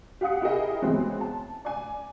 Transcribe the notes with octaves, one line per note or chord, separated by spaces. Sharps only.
G4 F5 F#5 D#6 C#7
E4 G4 G#4 A#4 D#5 G5
E3 F#3 G#3 B3 C4
A5
D5 G#5